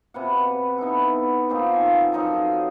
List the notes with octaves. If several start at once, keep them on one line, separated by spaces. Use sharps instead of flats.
C3 B4 F#5
B3 D#4 E4 A4
A#3 C4 D#4 F4
F3 A4 G#5
F#2 D#4 A4 F5